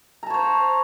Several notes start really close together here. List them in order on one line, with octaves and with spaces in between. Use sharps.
A#5 A5 C#5 C5